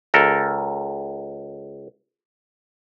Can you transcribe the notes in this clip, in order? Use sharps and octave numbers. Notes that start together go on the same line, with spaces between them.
C#2 A4 A#4